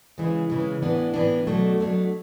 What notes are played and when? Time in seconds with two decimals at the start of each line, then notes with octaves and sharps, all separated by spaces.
0.18 C#3 E3 G#3
0.50 C#3 E3 G#3
0.82 A2 E3 B3 D4
1.14 A2 E3 B3 D4
1.47 B2 F#3 A3 D4
1.78 B2 F#3 A3 D4